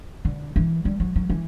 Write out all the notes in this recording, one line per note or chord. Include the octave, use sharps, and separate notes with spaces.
D3
E3
G3
F#3
F#3
E3